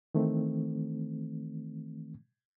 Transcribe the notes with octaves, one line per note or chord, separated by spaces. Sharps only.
D#3 E3 A3 C4